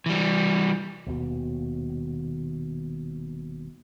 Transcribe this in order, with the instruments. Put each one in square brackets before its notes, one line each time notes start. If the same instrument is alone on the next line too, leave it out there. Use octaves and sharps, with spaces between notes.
[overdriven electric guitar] E3 G3
[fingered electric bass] D#1 D#2 B2